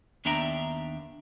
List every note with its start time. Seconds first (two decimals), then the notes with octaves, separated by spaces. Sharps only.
0.25 D#2 B3 D4 E5 G5 A#5